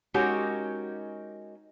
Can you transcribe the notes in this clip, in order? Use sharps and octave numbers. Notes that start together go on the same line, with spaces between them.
G#3 C#4 D#4 F#4 G4 A#4